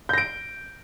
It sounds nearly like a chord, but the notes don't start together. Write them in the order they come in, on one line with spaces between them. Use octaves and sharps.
G6 A#6 D7